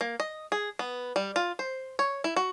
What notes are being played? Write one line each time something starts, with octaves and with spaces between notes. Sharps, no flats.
A#3
D#5
G#4
B3
G3
F4
C5
C#5
E4
F#4